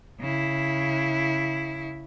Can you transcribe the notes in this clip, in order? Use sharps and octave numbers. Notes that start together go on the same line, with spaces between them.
C#3 E4